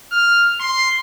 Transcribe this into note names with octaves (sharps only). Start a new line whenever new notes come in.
F6
C6